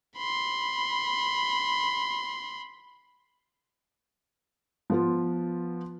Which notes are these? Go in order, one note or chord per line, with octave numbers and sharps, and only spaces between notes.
B5 C6
F3 B3 F4